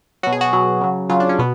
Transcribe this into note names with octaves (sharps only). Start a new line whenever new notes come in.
B2 F#3 F#4
G#4
F#4
B2 F#3
C#3 F#3
C#3 F#3 F4
D4
C#4
B2 B3